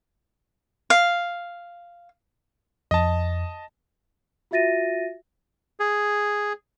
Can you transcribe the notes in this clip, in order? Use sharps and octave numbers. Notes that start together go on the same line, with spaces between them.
F5
F2 D#5 A5
F4 F#4 E5 A6 A#6 D#7
G#4